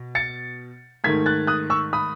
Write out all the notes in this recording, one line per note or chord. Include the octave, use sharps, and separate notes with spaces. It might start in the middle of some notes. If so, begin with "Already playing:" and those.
Already playing: B2
A6 C#7
G#2 D#3 A3 G#6 B6
F#6 A6
D#6 F#6
C#6 E6
B5 D#6